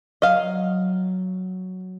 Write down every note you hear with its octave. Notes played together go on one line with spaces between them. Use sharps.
F#3 D#5 F5